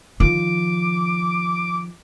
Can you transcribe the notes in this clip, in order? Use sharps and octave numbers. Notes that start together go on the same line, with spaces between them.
D#3 F3 D6